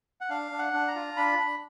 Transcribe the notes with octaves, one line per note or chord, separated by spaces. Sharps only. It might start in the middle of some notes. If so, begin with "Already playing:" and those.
F#5
D4 F5
D4
F#5
D4
A#5
F4
D4 B5
D4